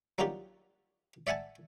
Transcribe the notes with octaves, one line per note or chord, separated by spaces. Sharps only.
F#3 A#3 D4 D#4 F4 G4
D5 E5 F#5 G#5 A5